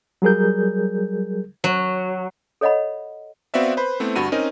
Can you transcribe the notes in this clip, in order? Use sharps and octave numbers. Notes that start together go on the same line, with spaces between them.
F#3 G3 G#4 A#4 G6
F#3
A4 C#5 D#5 F#5 B5
B3 C4 F#4 D5 E5 F5
B4 C5 B5
A3 B3 C4 E4
D2 G2 F#4 B5 D#7
C4 C#4 D#4 A#4